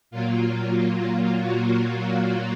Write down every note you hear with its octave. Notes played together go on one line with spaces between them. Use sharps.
A#2 F#3 A#3 F4
F#4